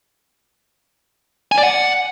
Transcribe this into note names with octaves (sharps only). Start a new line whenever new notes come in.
G#5
D5
F#5